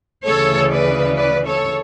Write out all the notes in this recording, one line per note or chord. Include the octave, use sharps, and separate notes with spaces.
D2 C#3 E3 A4 C#5
B4 D5
B4 D5
A4 C#5